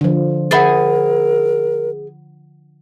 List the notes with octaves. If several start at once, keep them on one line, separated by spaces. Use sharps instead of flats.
D3 F3
G#4 A#4 C5 E5 F#5 B5 A6